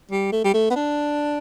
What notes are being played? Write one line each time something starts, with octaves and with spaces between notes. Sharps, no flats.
G3
A3
G3
A3
B3
D4